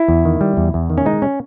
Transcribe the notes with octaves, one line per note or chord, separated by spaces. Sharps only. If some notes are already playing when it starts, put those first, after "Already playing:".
Already playing: E4
E2
D#3
G3
E2
E2
D#3
C#4
G#3 D#4
C#4